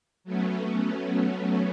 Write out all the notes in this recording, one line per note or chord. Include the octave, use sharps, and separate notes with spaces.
F#3 A3 B3 C#4